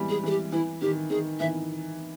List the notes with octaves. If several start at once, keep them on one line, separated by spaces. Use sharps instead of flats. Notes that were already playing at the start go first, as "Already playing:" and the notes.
Already playing: E3 G3 G#3
G#4
E3 G#4
G4
E3 E4
D#3 G4
D#3 G#4
E3 E5